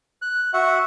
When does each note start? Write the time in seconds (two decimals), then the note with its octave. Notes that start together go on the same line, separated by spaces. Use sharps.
0.22 F#6
0.54 F#4 E5 F#5